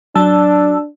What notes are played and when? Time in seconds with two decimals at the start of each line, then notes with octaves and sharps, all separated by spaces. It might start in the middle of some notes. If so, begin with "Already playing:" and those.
0.15 F#3 D4 A5 E6